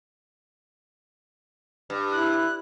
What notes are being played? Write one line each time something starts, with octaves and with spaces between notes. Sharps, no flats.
G2
E4 F#6